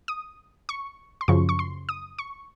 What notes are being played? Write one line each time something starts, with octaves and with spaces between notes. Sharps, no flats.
D#6
C#6
C6
F#2 C#3 F3 C#6
C#6
C6
D#6
C#6